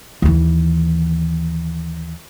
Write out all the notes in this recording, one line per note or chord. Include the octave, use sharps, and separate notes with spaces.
D#2 E3